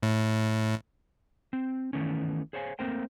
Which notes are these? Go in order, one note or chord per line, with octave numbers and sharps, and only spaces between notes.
A2
C4
D#3 E3 A3 B3 C#4
G#4 C5 C#5 F5 G#5
A3 A#3 C4 A#4 C5 G5